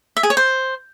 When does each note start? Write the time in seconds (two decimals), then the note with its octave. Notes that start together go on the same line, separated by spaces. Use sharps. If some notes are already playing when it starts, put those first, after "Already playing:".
0.17 E5
0.23 G#4
0.30 C#5
0.37 C5